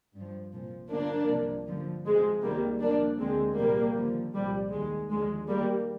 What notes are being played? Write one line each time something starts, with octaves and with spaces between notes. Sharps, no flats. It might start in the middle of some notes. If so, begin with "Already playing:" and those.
G2 F3
C2 A#2 F3
G2 D3 F3 A#3 D4
C2 C3 F3
G2 D3 F3
F2 C3 F3 G#3
C2 C3 D#3 G3 A#3
C2 A#2 F3 A#3 D4
D2 D3 F3 G#3 C4
C2 A#2 F3 G3 A#3
D#2 D3 F3
C2 A#2 F3 G3
D#2 D#3 G#3
D#2 D3 F3 G#3
D#2 D#3 G3 A#3